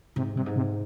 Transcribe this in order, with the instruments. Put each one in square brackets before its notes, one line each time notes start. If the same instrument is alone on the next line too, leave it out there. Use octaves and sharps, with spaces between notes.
[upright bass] G#2 [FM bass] C3
[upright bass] G2 [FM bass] C3
[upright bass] G#2
[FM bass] C3